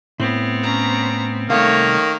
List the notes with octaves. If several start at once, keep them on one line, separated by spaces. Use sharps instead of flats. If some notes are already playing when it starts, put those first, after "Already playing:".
A2 B3 C4
C#4 A#5
C2 D#3 A3 A#3 C#5 F5